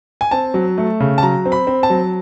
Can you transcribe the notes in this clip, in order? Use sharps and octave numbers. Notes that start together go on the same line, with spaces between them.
G#5
C4 A5
F#3
A3
C#3
A5
F#3 A#5
C4
B5
C4
A5
F#3